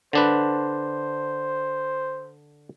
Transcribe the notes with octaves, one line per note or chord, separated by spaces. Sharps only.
D3 D4 B4 C5